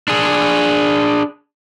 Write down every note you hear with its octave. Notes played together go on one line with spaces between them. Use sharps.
D4 G#4